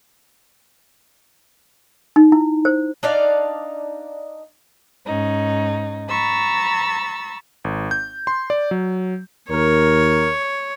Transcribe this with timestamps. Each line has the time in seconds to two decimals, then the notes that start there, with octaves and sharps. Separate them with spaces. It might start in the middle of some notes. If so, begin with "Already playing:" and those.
2.16 D#4
2.32 E4
2.65 C5
3.03 D4 D#4 D5 F5
5.06 G#2 C#4 D#4
6.10 A#5 B5 C#6 E6 A6
7.64 G#1
7.91 G6
8.27 C6
8.50 D5
8.71 F#3
9.50 D#2 A#4 C#5